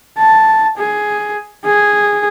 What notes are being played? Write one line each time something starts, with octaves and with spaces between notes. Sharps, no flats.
A5
G#4
G#4